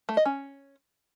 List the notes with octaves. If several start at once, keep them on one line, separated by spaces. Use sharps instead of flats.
A3
D#5
C#4